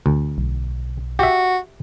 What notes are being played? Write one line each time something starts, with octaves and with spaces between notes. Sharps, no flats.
D2
B1
F#4 G4 E5